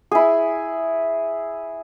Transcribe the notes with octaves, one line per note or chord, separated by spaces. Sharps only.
E4 G#4